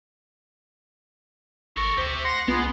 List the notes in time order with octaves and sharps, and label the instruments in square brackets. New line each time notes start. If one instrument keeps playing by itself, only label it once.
[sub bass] G#1 [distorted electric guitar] A4 A#4 [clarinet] C#6
[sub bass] D2 [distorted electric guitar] G4 E5 [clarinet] C5
[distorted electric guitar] F#5 [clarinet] C6 [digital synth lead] A#6
[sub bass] C2 [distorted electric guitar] G#3 [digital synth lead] B3 [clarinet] F4